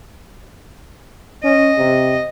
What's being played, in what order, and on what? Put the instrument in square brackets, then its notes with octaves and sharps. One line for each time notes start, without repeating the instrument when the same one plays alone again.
[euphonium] C#4 [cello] D#5
[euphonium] C3